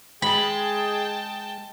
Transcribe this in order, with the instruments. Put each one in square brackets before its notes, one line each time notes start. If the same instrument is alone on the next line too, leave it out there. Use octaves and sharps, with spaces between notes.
[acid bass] G#3 [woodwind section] G#4 [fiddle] G5 A5 [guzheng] B5